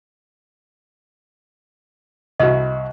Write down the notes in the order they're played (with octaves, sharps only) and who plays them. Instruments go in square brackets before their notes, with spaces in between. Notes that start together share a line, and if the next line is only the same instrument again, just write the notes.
[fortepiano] C2 E4 F#4 [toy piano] D#5